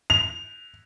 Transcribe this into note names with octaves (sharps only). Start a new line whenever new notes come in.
F7